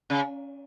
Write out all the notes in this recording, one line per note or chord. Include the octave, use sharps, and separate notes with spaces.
C#3